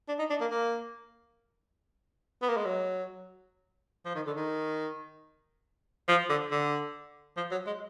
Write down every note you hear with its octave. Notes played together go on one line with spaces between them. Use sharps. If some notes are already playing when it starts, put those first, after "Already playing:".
D4
D#4
D4
A#3
A#3
B3
A#3
G#3
F#3
F3
D#3
D3
D#3
F3
D3
D3
F3
F#3
G#3